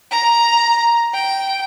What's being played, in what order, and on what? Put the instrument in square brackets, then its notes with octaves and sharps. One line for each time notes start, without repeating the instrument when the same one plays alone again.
[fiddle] A#5
G5